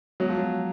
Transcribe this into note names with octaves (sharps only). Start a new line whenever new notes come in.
F#3 G#3 B3 F#4 C#5
F3
F#3